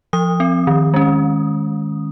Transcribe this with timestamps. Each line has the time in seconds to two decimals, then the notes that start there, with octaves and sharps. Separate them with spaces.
0.13 F3 D#6
0.40 C4
0.67 D#3
0.94 G#3 C#4